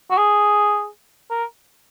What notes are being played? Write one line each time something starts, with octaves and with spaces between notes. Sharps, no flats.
F#4
G#4
A#4